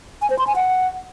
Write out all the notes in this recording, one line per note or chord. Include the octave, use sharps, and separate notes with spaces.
G#5
C5
C6
G#5
F#5